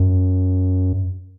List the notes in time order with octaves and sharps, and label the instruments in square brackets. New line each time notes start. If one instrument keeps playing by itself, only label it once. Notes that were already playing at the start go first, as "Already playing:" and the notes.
Already playing: [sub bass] F#2